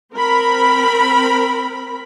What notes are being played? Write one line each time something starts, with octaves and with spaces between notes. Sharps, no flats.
C4 A#4 B5